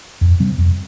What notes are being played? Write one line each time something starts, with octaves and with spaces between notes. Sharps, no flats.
F2
C3 G3 C4
F2